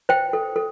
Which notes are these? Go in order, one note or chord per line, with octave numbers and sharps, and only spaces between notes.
C5 G5
A4
A4